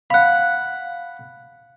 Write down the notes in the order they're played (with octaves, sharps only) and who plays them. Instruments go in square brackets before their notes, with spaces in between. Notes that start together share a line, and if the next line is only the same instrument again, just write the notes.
[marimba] F5 [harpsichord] F#5 B5